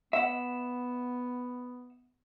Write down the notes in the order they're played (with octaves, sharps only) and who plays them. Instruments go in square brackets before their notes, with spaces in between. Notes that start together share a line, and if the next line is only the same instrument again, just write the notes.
[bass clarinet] B3 [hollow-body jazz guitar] E5 F#5